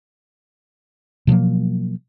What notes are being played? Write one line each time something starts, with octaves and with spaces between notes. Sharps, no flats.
B2 F3 F#3 A#3